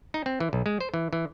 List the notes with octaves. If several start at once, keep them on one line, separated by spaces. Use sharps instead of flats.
D#4
C4
E3
B1
G#3
C5
E3
E3